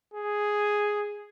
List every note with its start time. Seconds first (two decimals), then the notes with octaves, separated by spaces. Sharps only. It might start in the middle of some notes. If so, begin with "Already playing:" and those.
0.14 G#4